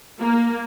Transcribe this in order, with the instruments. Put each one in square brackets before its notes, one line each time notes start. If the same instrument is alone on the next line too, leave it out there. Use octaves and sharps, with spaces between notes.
[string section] A#3